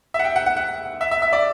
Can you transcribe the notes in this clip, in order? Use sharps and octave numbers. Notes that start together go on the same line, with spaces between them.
E5
F#5
G5
F#5
F#5
F#5
E5
E5
E5
D5